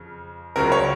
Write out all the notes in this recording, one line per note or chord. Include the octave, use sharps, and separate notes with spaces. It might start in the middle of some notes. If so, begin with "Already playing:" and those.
Already playing: F2 C#3
C#2 C#3 F#3 A#4
C#5